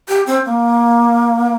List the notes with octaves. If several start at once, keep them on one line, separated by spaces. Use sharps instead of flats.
G4
C4
A#3